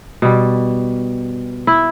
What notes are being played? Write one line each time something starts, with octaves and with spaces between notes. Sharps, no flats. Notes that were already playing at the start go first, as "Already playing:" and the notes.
B2 G3
E4